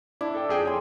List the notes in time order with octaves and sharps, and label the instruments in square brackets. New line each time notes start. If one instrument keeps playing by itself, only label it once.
[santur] D4 [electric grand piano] E4
[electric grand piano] A4 G5
F2 G#4 G5
[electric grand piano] C#5 [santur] G#5 C6